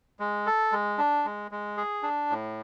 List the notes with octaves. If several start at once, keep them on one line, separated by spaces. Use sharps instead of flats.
G#3
A4
G#3
D4
G#3
G#3
G#4
D4
A2